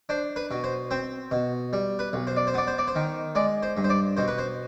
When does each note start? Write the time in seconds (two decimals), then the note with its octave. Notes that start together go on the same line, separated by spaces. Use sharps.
0.09 D4 C5
0.36 B4
0.51 B2
0.64 C5
0.91 C4 C5
1.31 B2
1.73 G3
1.99 B4
2.13 B1
2.27 C5
2.37 D5
2.47 C5
2.54 B3 D5
2.67 C5
2.78 D5
2.88 C5
2.95 D#3
3.35 G#3 D5
3.63 C5
3.77 G2
3.84 C5
3.90 D5
4.17 B2 C5
4.28 B4
4.38 C5